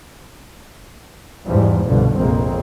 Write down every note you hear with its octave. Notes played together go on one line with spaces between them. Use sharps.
E2 G#2 E3 F3 G3
C2 G2 B2 D3 F3
F1 A#1 F2 G#3 A#3 C4